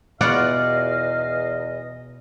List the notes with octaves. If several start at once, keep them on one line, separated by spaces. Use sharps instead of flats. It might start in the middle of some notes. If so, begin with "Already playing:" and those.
E2 B2 B3 F4 D5 D#5 F5 F#5